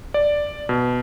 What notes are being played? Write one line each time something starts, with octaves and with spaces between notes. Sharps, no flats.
D5
B2